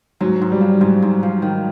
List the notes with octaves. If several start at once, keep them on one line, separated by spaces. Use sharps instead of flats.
G#2 F#3
G#2
G3
F3
G#2 F#3
G#2
F3
D#3